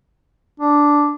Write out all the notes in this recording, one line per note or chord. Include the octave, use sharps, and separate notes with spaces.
D4